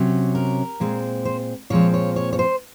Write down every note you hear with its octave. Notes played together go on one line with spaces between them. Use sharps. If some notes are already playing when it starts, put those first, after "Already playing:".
Already playing: C3 F#3 C#4
A#4
A#2 G#3 C4
C5
A#2 F3 G#3 C4 C#5
C#5
C#5
C#5
C5